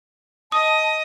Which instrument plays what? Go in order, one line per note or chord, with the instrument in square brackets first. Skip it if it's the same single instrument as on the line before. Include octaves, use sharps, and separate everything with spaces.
[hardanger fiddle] D#5 [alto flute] A5 [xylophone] D#6